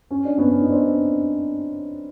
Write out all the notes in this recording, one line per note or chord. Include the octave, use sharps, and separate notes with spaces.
C#4
D4
B3 C#4
D#4
C4 D4